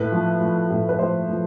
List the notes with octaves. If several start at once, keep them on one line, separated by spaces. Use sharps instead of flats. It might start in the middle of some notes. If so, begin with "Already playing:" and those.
Already playing: A2 B4
F3
F3
A2
B4
F3 C5
F3